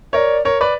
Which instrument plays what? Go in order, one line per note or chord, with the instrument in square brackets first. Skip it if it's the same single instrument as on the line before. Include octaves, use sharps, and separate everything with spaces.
[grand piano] A#4 C#5 [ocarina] D5 E5
[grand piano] A#4 C#5
B4 D5